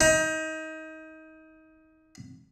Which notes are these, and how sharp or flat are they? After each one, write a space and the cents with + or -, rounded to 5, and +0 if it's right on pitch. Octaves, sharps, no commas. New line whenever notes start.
D#4 +25